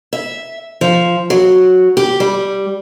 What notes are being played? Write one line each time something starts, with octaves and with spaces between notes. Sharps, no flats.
E5
F3
F#3
G4
G3